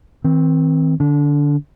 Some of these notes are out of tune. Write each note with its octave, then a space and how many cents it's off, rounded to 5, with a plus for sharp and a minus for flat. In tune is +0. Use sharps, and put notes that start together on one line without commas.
D#3 +45 C4 +0
D3 +0 D4 -25